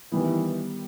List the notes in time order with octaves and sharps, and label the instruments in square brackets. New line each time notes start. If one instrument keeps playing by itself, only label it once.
[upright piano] D#3 G3 B3 [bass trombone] E3